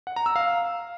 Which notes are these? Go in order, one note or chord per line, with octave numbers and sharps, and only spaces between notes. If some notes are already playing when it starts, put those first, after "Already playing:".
F#5
A#5
E6
F5